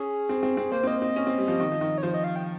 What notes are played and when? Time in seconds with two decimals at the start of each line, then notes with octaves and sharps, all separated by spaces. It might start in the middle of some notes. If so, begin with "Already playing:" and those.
Already playing: C#4 G#4
0.29 C4
0.43 C4
0.57 C4
0.72 A#3 C5
0.83 C4
0.87 A#3 D#5
1.01 C4 D#5
1.16 C#4
1.27 C4
1.38 G3
1.48 F3
1.60 D#3
1.72 F3
1.81 D#3
1.98 C#5
2.03 F3 C5
2.14 D#5
2.24 F5
2.36 G5